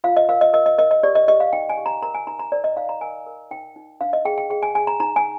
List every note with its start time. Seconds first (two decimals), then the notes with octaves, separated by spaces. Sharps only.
0.04 F4 F5
0.17 D#5
0.29 A#4 F5
0.41 D#5
0.53 A#4 D#5
0.66 D#5
0.78 A#4 D#5
0.91 D#5
1.03 G4 D5
1.15 D#5
1.28 G4 D#5
1.40 F5
1.53 D#4 G5
1.69 G#5
1.77 G4
1.86 A#5
2.02 A#4 A#5
2.15 G#5
2.27 D#4 A#5
2.39 A#5
2.52 A#4 D5
2.64 D#5
2.77 D#4 F5
2.89 A#5
3.01 A#4 G#5
3.26 A#4
3.51 D#4 G5
3.76 D#4
4.01 D4 F5
4.13 D#5
4.25 G#4 G5
4.38 G5
4.50 G#4 G5
4.63 G#5
4.75 G#4 G#5
4.87 A#5
5.00 D#4 A#5
5.16 G#5